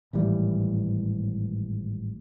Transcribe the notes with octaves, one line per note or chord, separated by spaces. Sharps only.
G#1 A2 E3 G3